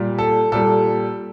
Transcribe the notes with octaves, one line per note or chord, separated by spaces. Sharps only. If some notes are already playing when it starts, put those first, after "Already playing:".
Already playing: A#2 G3
A4
A#2 G3 A4